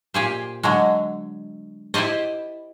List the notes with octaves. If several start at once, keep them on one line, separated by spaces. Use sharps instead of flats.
A#2 G4 G#4 C5
D3 F#3 G#3
E4 G4 C5 D5 D#5